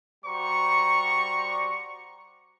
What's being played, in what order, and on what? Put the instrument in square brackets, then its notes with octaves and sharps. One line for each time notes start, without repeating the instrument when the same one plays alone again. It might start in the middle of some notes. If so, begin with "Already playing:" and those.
[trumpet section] G3 F#4 C5 D5 A#5 C#6